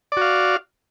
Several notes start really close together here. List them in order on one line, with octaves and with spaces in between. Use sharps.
D5 F#4 F5